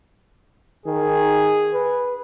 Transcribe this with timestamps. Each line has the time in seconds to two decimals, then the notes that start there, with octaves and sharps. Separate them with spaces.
0.86 D#3 G#4
1.73 B4